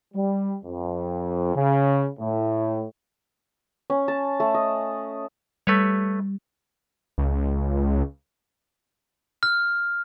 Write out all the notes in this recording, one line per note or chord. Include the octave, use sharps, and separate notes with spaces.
G3
F2
C#3
A2
C#4
A5
A3
D#5
G3 A3 B4 C#5
C#2
F6